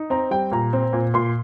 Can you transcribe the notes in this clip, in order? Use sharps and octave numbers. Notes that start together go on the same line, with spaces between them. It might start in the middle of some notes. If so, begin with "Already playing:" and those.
Already playing: D#4
C4 A#5
G3 G5
A#2 A#5
C4
A#2
A#2 C6